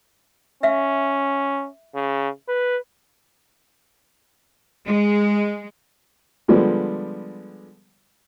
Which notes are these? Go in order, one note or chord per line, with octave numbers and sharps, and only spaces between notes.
C#4 E5 F5
C#3
B4
G#3
D3 F3 G3 G#3 B3